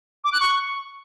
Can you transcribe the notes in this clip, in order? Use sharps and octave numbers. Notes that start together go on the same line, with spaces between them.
D6
F#6
C#6